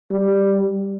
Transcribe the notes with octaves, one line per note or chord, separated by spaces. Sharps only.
G3